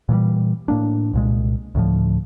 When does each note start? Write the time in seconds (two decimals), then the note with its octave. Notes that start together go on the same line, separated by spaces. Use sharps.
0.09 A#2 E3 F3 G3
0.68 A2 A#3 D4
1.13 C2 A#2 G#3
1.75 D2 A2 F3